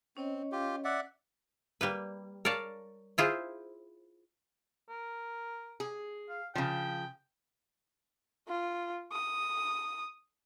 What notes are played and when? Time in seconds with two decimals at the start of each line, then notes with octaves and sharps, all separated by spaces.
0.17 C4 C#4 C#5 D#5
0.52 F4 G4
0.84 D5 E5 F#5
1.81 G3 A#3 B4
2.45 A#4 C#5 D5 F5 A5
3.18 E4 F4 G#4 C5
4.89 A#4
5.80 G#4
6.30 F5
6.55 C#3 F3 G5
8.48 F4
9.12 D#6